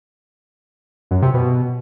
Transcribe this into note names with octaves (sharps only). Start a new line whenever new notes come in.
F#2
C3
B2